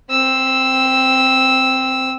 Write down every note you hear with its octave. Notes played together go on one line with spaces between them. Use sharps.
C4 E6